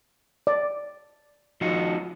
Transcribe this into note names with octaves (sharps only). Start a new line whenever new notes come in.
D5
F3 D#4 F#4